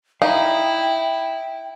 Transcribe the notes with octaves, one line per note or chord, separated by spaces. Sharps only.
D#4 E4 F5 G5